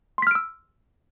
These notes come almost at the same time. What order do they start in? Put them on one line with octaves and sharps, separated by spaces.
C6 B6 F6 D7 E6